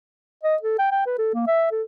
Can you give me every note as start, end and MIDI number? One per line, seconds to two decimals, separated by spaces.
0.43 0.56 75
0.62 0.77 69
0.78 0.87 79
0.91 1.03 79
1.06 1.15 71
1.18 1.30 69
1.34 1.46 58
1.47 1.68 76
1.71 1.82 69